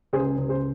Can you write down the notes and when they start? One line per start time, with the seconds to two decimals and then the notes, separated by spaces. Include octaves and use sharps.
0.13 C#2 G#4 C5
0.38 C#2
0.49 G#4 C5